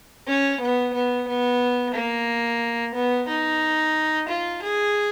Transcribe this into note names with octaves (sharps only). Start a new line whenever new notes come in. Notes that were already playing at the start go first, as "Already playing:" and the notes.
C#4
B3
B3
B3
A#3
B3
D#4
F4
G#4